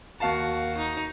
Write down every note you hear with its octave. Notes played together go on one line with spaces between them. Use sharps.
D#2 F#4 F5 A5
D#4